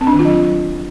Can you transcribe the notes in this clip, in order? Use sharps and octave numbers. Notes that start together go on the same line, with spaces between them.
C4
D4
D#3
F4
F#3